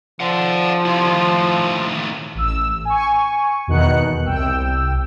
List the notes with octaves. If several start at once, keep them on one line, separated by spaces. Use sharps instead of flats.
F3 D5 F#5
G3 E4
A2 D#3
A1 E6
G#5 C#6
E2 B2 D#3 D#4 F#6 C#7
C2 G5 E6